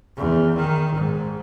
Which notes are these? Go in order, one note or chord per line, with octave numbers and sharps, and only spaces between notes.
E2
D#3
G#2